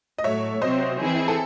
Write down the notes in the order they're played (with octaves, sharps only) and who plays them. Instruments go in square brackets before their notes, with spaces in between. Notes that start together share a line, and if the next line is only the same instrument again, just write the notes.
[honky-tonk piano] D#5
[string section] A2 F#3 A3 [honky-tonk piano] C#5 E5
[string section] C3 F#3 C4 [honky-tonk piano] C5 D#5
[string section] E3 C4 E4 G#4
[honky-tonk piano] A4